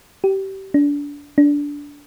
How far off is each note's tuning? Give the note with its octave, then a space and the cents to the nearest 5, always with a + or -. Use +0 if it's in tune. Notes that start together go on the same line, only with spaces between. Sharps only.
G4 -25
D4 -30
D4 -20